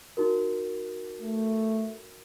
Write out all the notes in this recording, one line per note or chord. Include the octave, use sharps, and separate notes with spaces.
D#4 F#4 A#4
A3